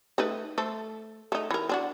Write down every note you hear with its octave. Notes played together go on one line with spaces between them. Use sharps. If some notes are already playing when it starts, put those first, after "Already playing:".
A3 D#4 B4
A3 A4 C5
A3 D#4
E3 A#4
C4 D4 F#4